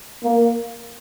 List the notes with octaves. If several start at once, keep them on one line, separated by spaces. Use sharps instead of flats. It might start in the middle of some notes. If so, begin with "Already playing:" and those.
A#3